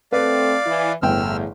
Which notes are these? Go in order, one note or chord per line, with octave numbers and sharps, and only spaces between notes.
A3 C4 A4 B4 D5 F5
E3 E4
G1 E2 A2 G5 E6 F6